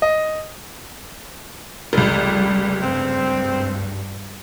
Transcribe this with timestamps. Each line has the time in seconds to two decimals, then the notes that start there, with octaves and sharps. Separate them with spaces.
0.02 D#5
1.93 F1 C#2 G3
2.83 G2 C4